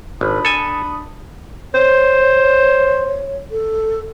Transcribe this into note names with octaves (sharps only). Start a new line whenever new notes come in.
G#1 D4 B5 D#6
A4 G#5
C5 C#5
A4